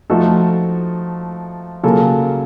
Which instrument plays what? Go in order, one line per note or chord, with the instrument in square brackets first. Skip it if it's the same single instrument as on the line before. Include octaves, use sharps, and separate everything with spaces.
[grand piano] F3 A3 D#4 F#4 A4
C#3 F#3 A#3 F4 A4